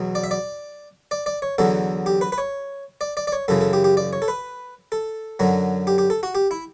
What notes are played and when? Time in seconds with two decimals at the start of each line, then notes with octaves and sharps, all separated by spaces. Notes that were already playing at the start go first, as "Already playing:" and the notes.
Already playing: E2 B2 F#3
0.15 D5
0.24 E5
0.31 D5
1.11 D5
1.26 D5
1.42 C#5
1.58 E2 D3 F#3 A4
2.06 G4
2.21 B4
2.32 B4
2.38 C#5
3.01 D5
3.17 D5
3.27 D5
3.32 C#5
3.48 F#2 C#3 E3 A4
3.61 A4
3.73 G4
3.84 G4
3.97 D5
4.13 C#5
4.22 A4
4.28 B4
4.92 A4
5.40 F#2 D3 F#3
5.87 G4
5.98 G4
6.10 A4
6.23 F#4
6.35 G4
6.51 E4